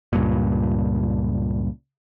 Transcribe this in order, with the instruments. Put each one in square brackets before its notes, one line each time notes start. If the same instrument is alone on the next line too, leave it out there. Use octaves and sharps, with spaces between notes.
[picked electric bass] C#2 G2 A#2